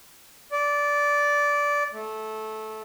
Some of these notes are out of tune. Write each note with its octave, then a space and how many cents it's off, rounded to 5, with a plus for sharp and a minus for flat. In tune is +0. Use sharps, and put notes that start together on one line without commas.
D5 -15
A3 -15